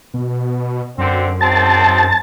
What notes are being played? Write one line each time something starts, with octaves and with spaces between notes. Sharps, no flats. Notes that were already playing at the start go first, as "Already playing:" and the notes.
B2
F#2 D3 C4
G#2 G#3 C4 A5